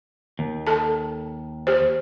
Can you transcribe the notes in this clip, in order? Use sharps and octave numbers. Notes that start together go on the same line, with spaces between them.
D#2
A4 A5
G4 C5